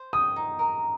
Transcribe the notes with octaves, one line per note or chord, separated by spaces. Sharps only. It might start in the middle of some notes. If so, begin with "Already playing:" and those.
Already playing: C5
G5 D#6
D#4
A#4